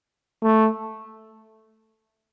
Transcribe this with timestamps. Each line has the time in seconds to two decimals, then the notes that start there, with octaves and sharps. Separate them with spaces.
0.43 A3